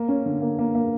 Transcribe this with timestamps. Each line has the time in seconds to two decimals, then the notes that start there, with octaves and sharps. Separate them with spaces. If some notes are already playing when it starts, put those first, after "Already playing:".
Already playing: A#3
0.08 C#4
0.26 D3
0.42 A#3
0.59 A#3
0.75 A#3